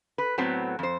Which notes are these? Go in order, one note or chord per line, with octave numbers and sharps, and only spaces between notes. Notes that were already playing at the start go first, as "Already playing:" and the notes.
B4
A2 F#3 B3 C4
F2 C5